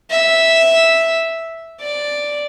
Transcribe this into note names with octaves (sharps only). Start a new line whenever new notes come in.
E5
D5